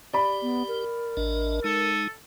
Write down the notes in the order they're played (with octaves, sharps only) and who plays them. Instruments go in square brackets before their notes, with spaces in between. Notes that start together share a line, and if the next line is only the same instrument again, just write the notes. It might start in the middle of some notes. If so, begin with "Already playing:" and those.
[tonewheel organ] G4 [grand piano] D5 B5
[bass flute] B3
A#4
[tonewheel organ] A1 D4 D#5
[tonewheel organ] G#3 D#4 [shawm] A4